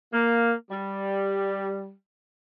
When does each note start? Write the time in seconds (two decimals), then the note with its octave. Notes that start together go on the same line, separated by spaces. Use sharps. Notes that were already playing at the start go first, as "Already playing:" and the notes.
0.12 A#3
0.71 G3